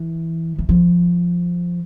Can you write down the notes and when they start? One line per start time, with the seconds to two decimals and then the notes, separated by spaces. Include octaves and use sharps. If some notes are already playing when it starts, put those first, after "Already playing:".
Already playing: E3
0.59 E3
0.69 F3